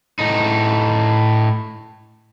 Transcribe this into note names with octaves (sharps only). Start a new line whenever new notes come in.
A2 D#4